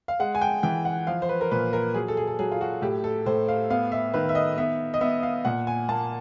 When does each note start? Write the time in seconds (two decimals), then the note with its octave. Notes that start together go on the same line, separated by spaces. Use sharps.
0.08 F5
0.20 G#3 F#5
0.35 G#5
0.41 G5
0.63 E3 G5
0.85 F#5
1.07 F3 F5
1.22 C5
1.29 B4
1.41 A#4
1.51 A#2 B4
1.73 A#4
1.94 F#3 G#4
2.08 A4
2.17 G#4
2.27 A4
2.39 F#3 G#4
2.52 F4
2.61 F#4
2.82 A2 G4
3.04 A4
3.26 A2 C5
3.48 F5
3.70 B3 F5
3.92 E5
4.14 D#3 B4
4.29 E5
4.35 D#5
4.57 B3 E5
4.94 D#5
5.01 B3 E5
5.23 F5
5.45 A#2 F#5
5.67 G#5
5.89 A#3 A5